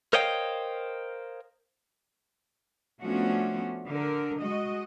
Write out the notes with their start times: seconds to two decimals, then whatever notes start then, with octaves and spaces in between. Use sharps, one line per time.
0.13 A#4 C5 C#5 D#5 F5 G5
3.02 F3 A3 B3 C#4 D4 F#4
3.87 D3 A#4
4.42 G#3 F#4 D#5